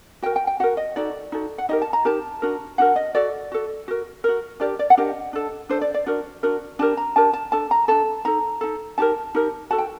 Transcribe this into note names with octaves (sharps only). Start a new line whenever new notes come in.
F#4 A#4 G5
G5
G5
F#4 A#4 F#5
D#5
D#4 F#4 A4 D5
D#4 F#4 A4
F#5
D#4 G4 A#4 D#5
A5
A#5
D#4 G4 A#4 A5
D4 F#4 A#4
D4 F#4 A#4 F#5
D#5
F#4 A4 D5
F#4 A4
F#4 A#4
F#4 A#4
D4 G4 A#4 D5
D5
F#5
D4 G4 A#4 D#5
D4 A4
D4 A4 C5
D5
D5
D4 F#4 A#4 D5
D4 F#4 A#4
D4 G4 A#4 A5
A#5
D4 G4 A#4 A5
A5
D4 A4 A5
A#5
D4 A4 A5
D#4 A4 A#5
D#4 A4
D#4 G4 A#4 A5
D#4 G4 A#4
F#4 A4 A5
G5